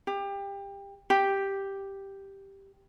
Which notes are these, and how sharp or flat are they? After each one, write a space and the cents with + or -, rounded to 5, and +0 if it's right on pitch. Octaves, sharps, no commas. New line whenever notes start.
G4 +25
G4 +0